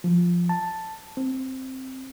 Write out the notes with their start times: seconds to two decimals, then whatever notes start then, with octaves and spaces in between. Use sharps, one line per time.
0.04 F3
0.49 A5
1.17 C4